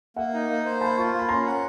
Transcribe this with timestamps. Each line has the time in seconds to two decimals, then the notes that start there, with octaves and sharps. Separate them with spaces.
0.16 A#3 E5 F#5
0.34 D#4
0.50 A#3
0.65 C5
0.81 A#3 A5 B5
0.98 F4 C#6
1.08 C6
1.14 A#3
1.19 B5
1.29 C#4 A#5 C6
1.46 F#5